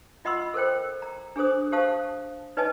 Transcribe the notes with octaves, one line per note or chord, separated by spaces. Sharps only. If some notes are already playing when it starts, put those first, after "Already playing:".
F4 D#5 F#5 B5 C6 E6
A4 A#4 C5 G5
A#5
D4 G#4 A4 C5 D#6
G4 C5 F5 A5 D#6
D#4 B4 C#5 D#5 G#5 A5